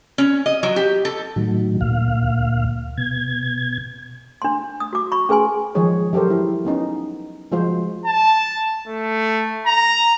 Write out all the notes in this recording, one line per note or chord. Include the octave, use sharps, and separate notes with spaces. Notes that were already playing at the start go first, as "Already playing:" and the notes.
C#4
D#5
F#3
G4
A4
A2 D#3 F#3
D2 A#2 F5
B2 G#6
D4 C6
D#6
F#4 D6
B5 C#6
C#4 G#4 B4 G#5 C6
D#3 F3 G#3 G#4 C#5
F#3 G4 A4 A#4 C5
G3 E4
B3 C#4 D#4
F3 G#3 F4 F#4 C5
A5
A3
A#5